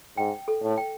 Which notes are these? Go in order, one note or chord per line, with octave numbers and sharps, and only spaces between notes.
G#2 G5
A4
A2
G5